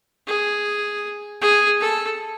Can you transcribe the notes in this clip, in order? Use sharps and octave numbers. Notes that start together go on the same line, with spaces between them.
G#4
G#4
A4